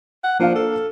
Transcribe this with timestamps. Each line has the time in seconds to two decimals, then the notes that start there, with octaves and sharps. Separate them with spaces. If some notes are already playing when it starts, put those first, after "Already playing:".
0.24 F#5
0.40 F3 A#3 D4 F5
0.55 A4